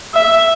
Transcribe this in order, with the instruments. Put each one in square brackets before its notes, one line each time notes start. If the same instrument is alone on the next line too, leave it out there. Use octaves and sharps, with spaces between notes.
[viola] E5